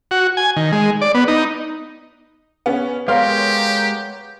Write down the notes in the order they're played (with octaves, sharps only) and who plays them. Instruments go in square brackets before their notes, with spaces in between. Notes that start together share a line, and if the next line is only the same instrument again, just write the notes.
[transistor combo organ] F#4
G#5
D#3
G#3
D5
B3
D#4
[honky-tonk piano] B3 C#4
[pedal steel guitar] G#3 A#4 [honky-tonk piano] B3 C#5 C6 [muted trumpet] G4 [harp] F5